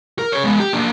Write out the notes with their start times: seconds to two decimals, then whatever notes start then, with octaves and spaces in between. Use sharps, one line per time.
0.19 A#4
0.32 G#4 C#5
0.44 G#3 B3
0.60 G4
0.73 A#3 D4